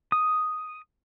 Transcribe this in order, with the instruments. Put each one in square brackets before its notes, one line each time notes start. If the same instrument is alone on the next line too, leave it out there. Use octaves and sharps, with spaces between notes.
[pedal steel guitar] D#6